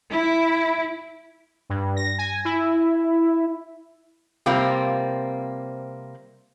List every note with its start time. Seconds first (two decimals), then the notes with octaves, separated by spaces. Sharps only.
0.11 E4
1.70 G2
1.96 A#6
2.18 G#5
2.45 E4
4.46 C3 G3 A#3 C4 F4